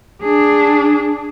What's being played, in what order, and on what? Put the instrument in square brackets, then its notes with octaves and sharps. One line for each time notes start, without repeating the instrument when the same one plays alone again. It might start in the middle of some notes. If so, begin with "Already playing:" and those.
[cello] D4 G#4